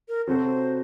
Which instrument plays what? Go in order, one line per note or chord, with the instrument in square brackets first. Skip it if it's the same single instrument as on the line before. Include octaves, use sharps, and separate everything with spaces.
[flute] A#4
[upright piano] C3 F#3 C4 F#4 A4 [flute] C5